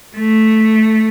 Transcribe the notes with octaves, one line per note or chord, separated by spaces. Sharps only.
A3